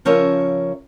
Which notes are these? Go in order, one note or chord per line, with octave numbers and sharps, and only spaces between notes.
C#3 F3 C#4 A#4 C#5 E5